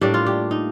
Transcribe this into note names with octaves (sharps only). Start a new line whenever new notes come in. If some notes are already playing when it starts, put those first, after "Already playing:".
A2 G3 A#3 D4 G4
F4
G4
D#4